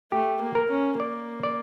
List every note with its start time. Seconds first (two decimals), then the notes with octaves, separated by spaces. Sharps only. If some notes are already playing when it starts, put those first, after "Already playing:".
0.12 A3 G4
0.41 A#3
0.55 A#4
0.70 C#4
0.99 A#3 D5
1.43 D5